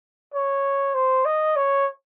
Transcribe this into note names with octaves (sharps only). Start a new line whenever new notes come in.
C#5
C5
D#5
C#5